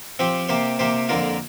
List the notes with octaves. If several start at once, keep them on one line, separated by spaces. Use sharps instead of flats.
F3 C4 G4
C3 A#3 G4 C5
C3 A#3 G4 C5
F2 D3 A#3 F4 A#4